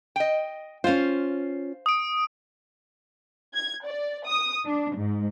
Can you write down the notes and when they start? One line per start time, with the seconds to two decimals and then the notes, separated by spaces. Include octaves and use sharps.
0.16 D#5 G5
0.84 C#4 F4 C5 F5
1.86 D#6 D7
3.54 G#6
3.86 D5
4.26 D#6
4.65 D4
4.97 G#2